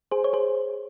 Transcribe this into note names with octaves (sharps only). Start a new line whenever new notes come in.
G#4 C5
C#5
G#4 C5